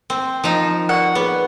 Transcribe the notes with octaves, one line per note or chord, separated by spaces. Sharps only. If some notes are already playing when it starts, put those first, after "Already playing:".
C4
F3 D#4 A#4 G5
A#4 D5 F#5 C#6
B3 G#4 B4 C#5